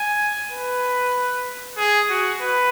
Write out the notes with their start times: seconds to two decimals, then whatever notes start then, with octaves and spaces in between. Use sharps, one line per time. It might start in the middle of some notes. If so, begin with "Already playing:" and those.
Already playing: G#5
0.51 B4
1.78 G#4
2.10 F#4
2.41 B4